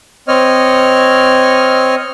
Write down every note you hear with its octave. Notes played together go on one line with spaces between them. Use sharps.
C4 C#5 D#5 F6